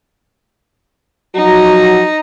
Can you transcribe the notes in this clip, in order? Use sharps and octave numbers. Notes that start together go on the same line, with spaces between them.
F3 F#3 D#4 F#4 A#5